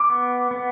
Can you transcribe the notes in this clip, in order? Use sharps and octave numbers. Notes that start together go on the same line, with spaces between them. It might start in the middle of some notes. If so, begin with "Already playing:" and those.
Already playing: D6
B3
B3